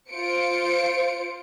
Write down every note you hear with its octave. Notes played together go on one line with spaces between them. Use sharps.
F4 C5 C#7 D7